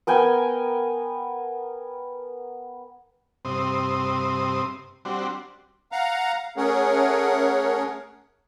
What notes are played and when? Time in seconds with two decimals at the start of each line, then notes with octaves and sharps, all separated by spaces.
0.07 B3 A#4 G5 G#5
3.45 G2 C3 C4 D#6
5.05 G3 C4 D4 F#4
5.92 F5 F#5 A#5
6.57 A3 C#4 G#4 A#4 C#5 F#5